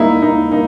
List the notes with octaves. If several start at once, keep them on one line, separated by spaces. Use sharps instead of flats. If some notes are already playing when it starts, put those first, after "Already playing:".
Already playing: G3 A#3 D#4 E4
A#3 D#4
A#3 D#4